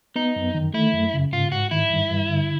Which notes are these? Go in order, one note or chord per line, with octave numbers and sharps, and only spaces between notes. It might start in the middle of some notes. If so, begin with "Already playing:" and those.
B3 D#4
F#2
D#3
A3 E4
F#2
C#3
G#2 F4
G#2 F#4
D#3 E4
G2
G2
D3